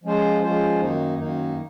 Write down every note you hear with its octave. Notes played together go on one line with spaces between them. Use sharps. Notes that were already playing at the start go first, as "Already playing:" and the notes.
F3 G#3 C#4 F4 C5
F3 G#3 C#4 F4 C5
F#2 D#3 A#3 D#4
F#2 D#3 A#3 D#4